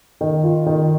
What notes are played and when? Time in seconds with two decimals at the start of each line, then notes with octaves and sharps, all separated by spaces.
0.21 D#3
0.43 F4
0.66 D#3